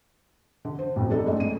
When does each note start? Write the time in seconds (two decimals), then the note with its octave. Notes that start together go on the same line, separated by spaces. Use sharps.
0.65 D3
0.79 C5
0.96 A1 F2 B2
1.10 G#3 D4 D#4 A4
1.27 F2 G#2 A3 C#4
1.40 D#7